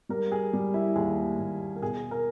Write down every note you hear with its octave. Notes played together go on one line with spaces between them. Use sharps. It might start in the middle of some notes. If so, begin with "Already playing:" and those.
G3 A#4
G#4
G3
E4
D#2 G#4
D#2
A#4
B2 G#4
A#4